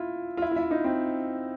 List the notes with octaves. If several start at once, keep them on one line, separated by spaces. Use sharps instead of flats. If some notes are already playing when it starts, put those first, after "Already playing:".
Already playing: E4 F4
F4
E4
F4
E4
D#4
C4